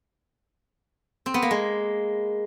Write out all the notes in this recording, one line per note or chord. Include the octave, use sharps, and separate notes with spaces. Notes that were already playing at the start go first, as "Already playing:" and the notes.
C4
B3
A#3
G#3